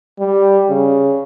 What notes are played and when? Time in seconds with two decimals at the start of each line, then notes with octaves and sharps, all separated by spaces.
0.19 G3
0.70 C#3